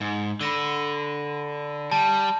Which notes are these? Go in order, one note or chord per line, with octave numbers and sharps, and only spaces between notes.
G#2
D3 B5 A#6 D#7
G3 A5